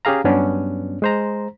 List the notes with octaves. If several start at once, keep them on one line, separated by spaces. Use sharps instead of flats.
C#4 G4 G#4 F5 A#5
G2 F#3 B3 C#4 D4
G#3 C5 A#5